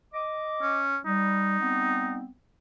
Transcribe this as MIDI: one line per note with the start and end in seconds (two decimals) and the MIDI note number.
0.13 0.78 75
0.13 0.78 86
0.62 0.97 61
1.06 1.59 55
1.06 2.20 63
1.60 2.27 55
1.60 2.27 59
1.60 2.27 60